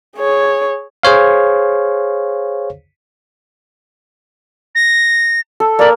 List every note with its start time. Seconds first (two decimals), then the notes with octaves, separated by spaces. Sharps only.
0.17 G#4 C#5
1.03 G#4 C5 C#5 F5
4.75 A#6
5.60 A4
5.79 A#3 A#4 D5